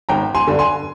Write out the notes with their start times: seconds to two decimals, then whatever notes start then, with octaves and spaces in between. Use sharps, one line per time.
0.09 G#1 G5 A#5
0.35 G#5 C6
0.47 G2 D3
0.59 G#5 C6